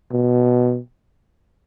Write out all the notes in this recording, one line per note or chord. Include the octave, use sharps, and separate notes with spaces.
B2